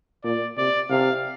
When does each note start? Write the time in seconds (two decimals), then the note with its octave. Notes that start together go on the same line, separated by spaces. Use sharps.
0.24 A#2 D5
0.57 C3 D5
0.90 C3 F5